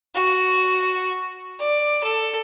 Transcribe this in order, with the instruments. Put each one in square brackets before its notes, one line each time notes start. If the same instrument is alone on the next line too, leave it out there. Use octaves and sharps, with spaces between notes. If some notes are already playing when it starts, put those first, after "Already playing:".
[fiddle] F#4
D5
A4